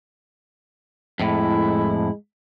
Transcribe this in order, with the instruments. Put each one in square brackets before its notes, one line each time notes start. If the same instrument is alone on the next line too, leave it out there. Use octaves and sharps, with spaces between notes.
[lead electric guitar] F2 A2 [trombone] G#3 [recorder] E4